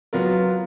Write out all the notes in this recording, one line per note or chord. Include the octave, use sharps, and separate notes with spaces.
F#3 B3 F4 A#4